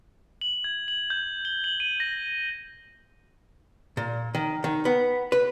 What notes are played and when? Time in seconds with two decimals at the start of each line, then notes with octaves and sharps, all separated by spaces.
0.41 F#7
0.64 G#6
0.88 F#7
1.10 G6
1.45 G7
1.64 F#7
1.80 D#7
2.00 A#6
3.97 A#2
4.35 D#3
4.64 D#3
4.85 B3
5.32 B4